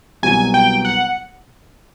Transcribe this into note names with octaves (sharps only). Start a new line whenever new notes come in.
C2 B2 F#3 G#5
G5
F#5